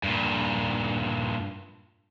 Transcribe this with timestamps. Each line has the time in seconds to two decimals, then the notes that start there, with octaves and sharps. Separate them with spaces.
0.04 G2 A#2